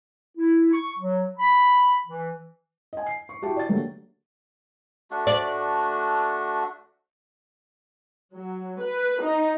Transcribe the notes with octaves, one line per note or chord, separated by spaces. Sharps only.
E4
C#6
F#3
B5
E3
D#5 G#5
C7
C#6
E4 F#4 G4 A5 C#6
D5 A6
D3 F#3 A3 A#3 D4 G4
A3 D4 F#4
D5
F#3
B4
D#4